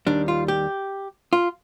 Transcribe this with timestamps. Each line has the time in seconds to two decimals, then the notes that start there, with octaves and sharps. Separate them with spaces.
0.07 D#2 D#3 G3 D4
0.28 F4
0.48 G4
1.33 F4